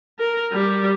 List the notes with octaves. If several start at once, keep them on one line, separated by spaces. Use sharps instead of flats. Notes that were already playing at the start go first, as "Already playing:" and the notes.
A#4
G3